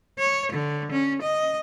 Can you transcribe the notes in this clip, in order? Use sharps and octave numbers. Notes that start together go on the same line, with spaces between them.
C#5
D3
C#4
D#5